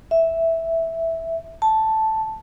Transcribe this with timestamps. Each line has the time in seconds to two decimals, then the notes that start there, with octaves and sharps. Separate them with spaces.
0.11 E5
1.62 A5